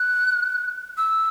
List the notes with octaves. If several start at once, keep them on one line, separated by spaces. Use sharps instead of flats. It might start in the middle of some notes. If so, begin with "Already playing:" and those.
Already playing: F#6
E6